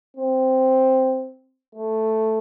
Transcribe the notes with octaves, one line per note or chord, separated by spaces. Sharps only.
C4
A3